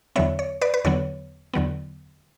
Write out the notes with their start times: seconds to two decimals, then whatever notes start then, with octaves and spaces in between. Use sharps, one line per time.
0.16 E2 D3 F#3 B3 C#5 E5
0.39 C#5
0.61 B4 D5
0.74 B4
0.85 E2 D3 F#3 B3 C#5
1.54 E2 D3 F#3 B3